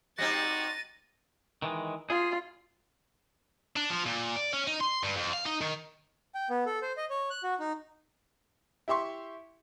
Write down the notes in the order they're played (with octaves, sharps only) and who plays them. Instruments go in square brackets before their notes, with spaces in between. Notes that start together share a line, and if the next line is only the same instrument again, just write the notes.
[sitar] G3 C4 D#4 [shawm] F#4 [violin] A6 D#7 [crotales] A#6
[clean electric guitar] D#3 E3 G#3
[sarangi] F4 [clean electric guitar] G#4
[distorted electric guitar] D4
F3
A#2
D5
C#4
D#4
C6
G2
F2
F5
D#4
D#3
[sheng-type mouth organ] G5
B3
A4
C5
D#5
C#5
F#6
F#4
D#4
[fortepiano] E4 G4 E5 C6 C#6